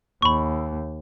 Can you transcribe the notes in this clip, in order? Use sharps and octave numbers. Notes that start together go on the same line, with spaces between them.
D#2 B5 C#6